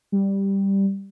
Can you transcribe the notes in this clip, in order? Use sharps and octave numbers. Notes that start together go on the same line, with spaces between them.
G3